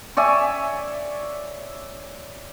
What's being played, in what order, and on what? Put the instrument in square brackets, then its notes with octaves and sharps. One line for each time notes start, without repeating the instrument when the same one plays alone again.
[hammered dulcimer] C#5 D5 E5 G#5